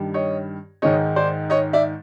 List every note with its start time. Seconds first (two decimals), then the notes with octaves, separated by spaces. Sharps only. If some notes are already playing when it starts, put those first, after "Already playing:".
Already playing: G2 D#3 G3
0.14 C#5 D#5
0.82 G#2 D#3 G#3 C#5 D#5
1.16 C5 D5
1.50 C#5 D#5
1.73 D5 E5